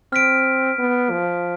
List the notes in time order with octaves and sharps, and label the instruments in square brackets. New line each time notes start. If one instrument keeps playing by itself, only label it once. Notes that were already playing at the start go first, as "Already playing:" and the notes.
[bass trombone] C4 [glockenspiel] F6 B6 D7
[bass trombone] B3
F3